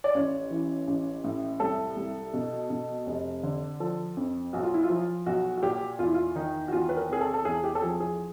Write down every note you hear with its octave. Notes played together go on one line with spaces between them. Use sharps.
D5
A1 C#5
E3
A1
A2
C2 A4
C2
B2
B2
F1
D3
F3 A4
F2
B1 F#4
F4
E4
F4
F3
B1 F#4
F#4
A#2 G4
E2 F4
E4
F4
D#3 D#4
F#4
E2 F4
B4
A#4
C3 G#4
A4
A4
E2 G#4
G4
A4
F3 G#4
G#4